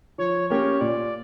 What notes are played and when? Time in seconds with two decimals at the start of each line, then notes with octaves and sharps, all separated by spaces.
0.18 F3 C#5
0.50 A#3 C#4 G4 A#4 C#5
0.81 A#2 D5